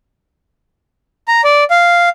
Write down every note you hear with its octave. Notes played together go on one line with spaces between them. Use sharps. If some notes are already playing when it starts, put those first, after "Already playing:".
A#5
D5
F5